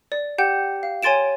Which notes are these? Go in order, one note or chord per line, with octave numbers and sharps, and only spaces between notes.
D5
G4 F#5 G5 G6
F5
C#5 G#5 C6 A6 D7 E7